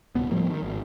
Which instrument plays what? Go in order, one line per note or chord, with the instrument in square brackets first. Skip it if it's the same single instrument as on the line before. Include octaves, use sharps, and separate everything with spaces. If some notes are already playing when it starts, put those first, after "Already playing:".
[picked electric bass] D1 C2 B2 B3
A2 F3 G3 A#3
D#3
G#1